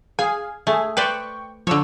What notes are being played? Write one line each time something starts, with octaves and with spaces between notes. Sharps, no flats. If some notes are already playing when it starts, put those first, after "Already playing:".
G#4 F5 G#5
A3 G#4
B4 C5 D5 G5 C#6
D3 F3 C#5 E6